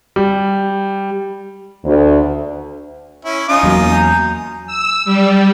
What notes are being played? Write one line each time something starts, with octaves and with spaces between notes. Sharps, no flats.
G3
D2
C#4 E4
C#4 D#4 F4 D#6
E2 F#3 A#3
G#5 A#5 G6
E6
G3